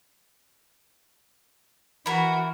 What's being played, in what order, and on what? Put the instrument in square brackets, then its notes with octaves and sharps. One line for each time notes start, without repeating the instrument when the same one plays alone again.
[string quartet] E3 F#4 [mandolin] E4 A#4